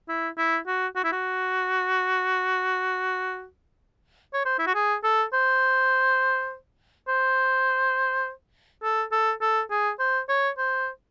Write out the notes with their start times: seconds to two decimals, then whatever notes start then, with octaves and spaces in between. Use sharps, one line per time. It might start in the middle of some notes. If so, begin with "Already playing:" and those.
0.09 E4
0.38 E4
0.67 F#4
0.96 F#4
1.04 E4
1.12 F#4
4.34 C#5
4.45 C5
4.59 E4
4.67 F#4
4.75 G#4
5.04 A4
5.33 C5
7.08 C5
8.83 A4
9.12 A4
9.41 A4
9.71 G#4
9.99 C5
10.29 C#5
10.58 C5